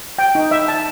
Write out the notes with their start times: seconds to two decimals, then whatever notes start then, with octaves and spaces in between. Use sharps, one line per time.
0.18 G5
0.35 D#4
0.51 E5
0.68 A5